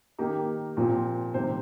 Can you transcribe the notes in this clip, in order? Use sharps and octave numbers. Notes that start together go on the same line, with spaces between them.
D#3 A#3 D#4 G4
A#2 F3 C4
C3 D#3 G3 C5